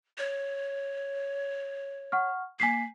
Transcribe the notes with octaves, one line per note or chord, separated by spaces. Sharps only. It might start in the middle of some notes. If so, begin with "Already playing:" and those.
C#5
F#5 C#6 F6
A#3 G#5 B6 C7